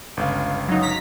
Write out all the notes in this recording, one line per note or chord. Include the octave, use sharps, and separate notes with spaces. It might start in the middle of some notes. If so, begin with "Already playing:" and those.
G1 C#2 F5
F#3 D#4
A#5 B6